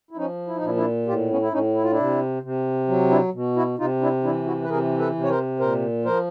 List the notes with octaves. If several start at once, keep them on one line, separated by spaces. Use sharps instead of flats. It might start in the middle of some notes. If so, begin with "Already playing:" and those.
E4
F3 C#4 D#4
E4
D#4
A#2 D4 E4
D4 E4
A2 F4 G4
B3 C#4
E4
A2 C#4 D#4
E4
F4
D4 E4
C3
C3
F#3
D4 E4
B2
E4 F#4
C3 D#4 F4
D4 E4
E3 D4 E4
E4 F#4
B4
C3 G#4 A#4
A4 B4
C3
C#5
A#4 C5
A#2 A#4 C5
F3 A#4 C5